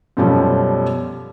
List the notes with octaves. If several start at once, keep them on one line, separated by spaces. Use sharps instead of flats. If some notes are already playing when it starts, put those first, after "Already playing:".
F#2 B2 F3 G3 A3 C#4